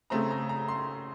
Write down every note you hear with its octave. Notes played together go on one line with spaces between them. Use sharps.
C#3 A3 C4 A#5
A#5
A#5
C6